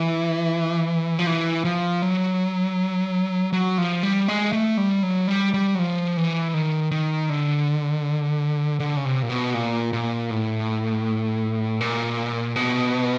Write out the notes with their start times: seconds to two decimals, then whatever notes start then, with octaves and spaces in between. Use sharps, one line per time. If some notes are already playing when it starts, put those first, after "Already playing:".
Already playing: E3
1.19 F3
1.27 E3
1.65 F3
2.02 F#3
3.53 F#3
3.78 F3
4.03 G3
4.28 G#3
4.53 A3
4.78 G3
5.03 F#3
5.28 G3
5.54 G3
5.75 F#3
5.79 F3
6.17 E3
6.54 D#3
6.91 D#3
7.30 D3
8.80 D3
8.97 C#3
9.05 C3
9.22 A#2
9.29 B2
9.54 A#2
9.93 A#2
10.31 A2
11.81 A#2
12.56 B2